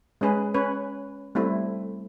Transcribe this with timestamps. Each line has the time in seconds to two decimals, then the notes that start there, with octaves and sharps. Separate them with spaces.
0.21 G#3 C#4 G#4 B4
0.54 C#4 B4 C#5
1.35 G3 A3 C4 E4